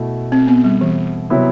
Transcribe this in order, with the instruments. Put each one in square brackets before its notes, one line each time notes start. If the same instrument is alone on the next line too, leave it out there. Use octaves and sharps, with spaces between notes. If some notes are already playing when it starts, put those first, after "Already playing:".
Already playing: [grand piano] B2 A3 E4
[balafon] C4
B3
G3
E3
[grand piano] C3 F#3 B3 E4